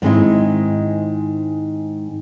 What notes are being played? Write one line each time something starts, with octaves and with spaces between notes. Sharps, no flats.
G#2 D#3 G#3 C4 D#4 E4